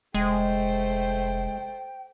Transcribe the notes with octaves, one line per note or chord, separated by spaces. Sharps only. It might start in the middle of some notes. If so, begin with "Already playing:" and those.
F1 G#3 A3 C5 G5